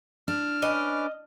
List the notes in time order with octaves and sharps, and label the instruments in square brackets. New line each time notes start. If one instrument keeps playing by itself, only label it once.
[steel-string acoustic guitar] D4 [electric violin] F6
[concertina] C#4 B4 D6 [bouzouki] D#5